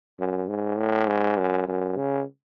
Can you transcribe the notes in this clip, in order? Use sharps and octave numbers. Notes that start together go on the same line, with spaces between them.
F#2
G#2
A2
G#2
F#2
F#2
C#3